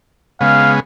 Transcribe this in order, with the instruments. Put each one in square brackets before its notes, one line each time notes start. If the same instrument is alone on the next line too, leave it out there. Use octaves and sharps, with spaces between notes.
[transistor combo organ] C#3 G#3 B3 [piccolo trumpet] F5